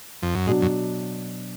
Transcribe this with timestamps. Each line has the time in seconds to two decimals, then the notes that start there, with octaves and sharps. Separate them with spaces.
0.22 F2
0.35 F#2
0.47 G#2 B2 F#3 D4
0.62 F#2